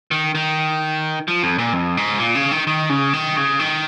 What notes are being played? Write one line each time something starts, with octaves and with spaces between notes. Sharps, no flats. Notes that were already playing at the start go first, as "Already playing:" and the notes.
D#3
D#3
F3
F2
A#2
F2
G#2
A#2
C#3
D#3
D#3
C#3
D#3
C#3
D#3